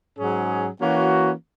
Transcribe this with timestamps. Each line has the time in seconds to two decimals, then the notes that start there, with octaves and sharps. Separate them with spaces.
0.17 G#2 F#3 C#4 G#4
0.80 E3 A#3 C#4 F#4